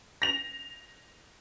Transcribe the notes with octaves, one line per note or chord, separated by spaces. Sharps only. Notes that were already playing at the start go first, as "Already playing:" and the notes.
A#6 F7